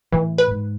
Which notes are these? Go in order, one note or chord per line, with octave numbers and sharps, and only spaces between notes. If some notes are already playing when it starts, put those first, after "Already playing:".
A2 E3
B4
G#2